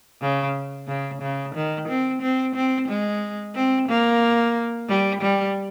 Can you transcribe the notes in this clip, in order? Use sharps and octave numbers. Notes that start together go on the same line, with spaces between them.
C#3
C#3
C#3
D#3
C4
C4
C4
G#3
C4
A#3
G3
G3